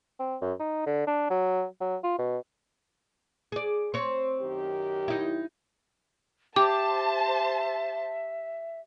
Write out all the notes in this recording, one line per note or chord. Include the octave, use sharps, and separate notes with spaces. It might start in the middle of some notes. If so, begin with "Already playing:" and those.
C4
F#2
D#4
D3
D4
F#3
F#3
F4
B2
G#4 D5
C4 C#5
F#2 D#3 G4
D#4 E4
G4 C5 E5 A5 D6